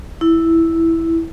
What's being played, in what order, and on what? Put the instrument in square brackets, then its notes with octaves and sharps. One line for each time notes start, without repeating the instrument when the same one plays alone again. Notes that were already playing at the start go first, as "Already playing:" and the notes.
[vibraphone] E4